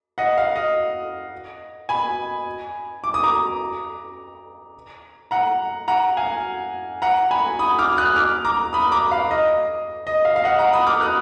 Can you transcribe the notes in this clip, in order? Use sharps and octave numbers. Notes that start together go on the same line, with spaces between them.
D#5 F#5
F5
D#5
G#5 B5
D6
D#6
A#5 D6
F#5 A#5
F#5 A#5
F5 G#5
F#5 A#5
G#5 B5
B5 D#6
D6 F6
D#6 F#6
D6 F6
A#5 D6
B5 D#6
A#5 D6
F5
D#5
D#5
F5
F5
D#5 F#5
F#5 A#5
B5 D#6
D6 F6
D#6 F#6